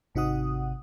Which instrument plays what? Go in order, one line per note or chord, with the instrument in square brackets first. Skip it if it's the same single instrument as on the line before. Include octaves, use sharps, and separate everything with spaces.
[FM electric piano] G#1 C3 D#4 F#4 F#5 D#6